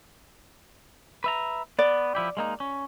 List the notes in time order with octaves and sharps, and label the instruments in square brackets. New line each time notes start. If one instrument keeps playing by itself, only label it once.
[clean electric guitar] B4 E5 A#5
[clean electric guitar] B3 [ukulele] D5
[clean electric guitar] F3 E4 G4
G#3 A#3 D#4
C#4